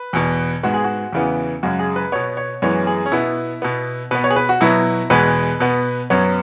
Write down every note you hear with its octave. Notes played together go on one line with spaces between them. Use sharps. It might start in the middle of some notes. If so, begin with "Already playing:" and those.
Already playing: B4
E2 B2 B3
G#2 G#3 B3 F#4
G#4
F#4
E2 C#3 E3 B3
F#2 C#3 G#3 F#4
G#4
B4
B2 B3 C#5
C#5
F#2 E3 G#3 B3 C#5
G#4
C#4
B2 B3 E4
B2 B3
B2 B3 B4
C#5
G#4
B4
F#4
B2 F#3 B3 E4
E2 B2 G#3 B3 B4
B2 B3
F#2 F#3 B3 C#5